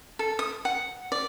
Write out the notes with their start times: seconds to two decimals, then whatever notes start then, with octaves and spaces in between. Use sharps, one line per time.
0.19 A4
0.39 D#6
0.65 F#5
1.12 D5